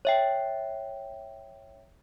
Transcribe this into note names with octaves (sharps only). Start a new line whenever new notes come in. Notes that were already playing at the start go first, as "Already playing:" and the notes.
C#5 E5 G5